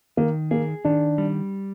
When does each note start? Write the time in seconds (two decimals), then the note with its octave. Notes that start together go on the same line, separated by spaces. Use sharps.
0.17 D#3 A#3
0.51 A#3 G#4
0.85 D#3 D4
1.18 G3